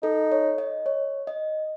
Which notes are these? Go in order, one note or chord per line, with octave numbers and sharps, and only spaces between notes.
D#4 A4
C#5
D#5
C#5
D#5